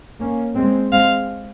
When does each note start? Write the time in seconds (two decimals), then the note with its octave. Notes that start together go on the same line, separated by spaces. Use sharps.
0.20 A#3 C#4
0.56 G#3 C4
0.92 G#3 C4 F5